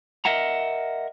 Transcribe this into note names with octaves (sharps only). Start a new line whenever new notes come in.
A#4 D#5 E5 F#5 A#5